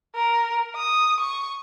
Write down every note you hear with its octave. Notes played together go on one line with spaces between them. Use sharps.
A#4
D#6
C#6